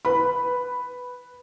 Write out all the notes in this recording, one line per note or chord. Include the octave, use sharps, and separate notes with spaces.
B4 B5